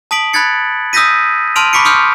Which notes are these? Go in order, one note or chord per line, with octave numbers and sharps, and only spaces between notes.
A5 D#6 B6 D7 F#7
B5 F#6 G#6 A6 C#7
D#6 E6 G6 A#6 B6 D#7
A5 C6 F6 D7 D#7 F7
B5 C#6 D6 B6 C#7 D7
C6 C#6 D#6 F6 G6 C#7